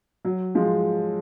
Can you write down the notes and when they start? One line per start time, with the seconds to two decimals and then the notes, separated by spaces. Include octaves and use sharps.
0.25 F#3
0.55 F3 G#3